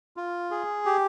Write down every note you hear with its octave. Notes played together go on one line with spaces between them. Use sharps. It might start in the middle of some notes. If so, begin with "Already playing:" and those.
F4
G#4
G4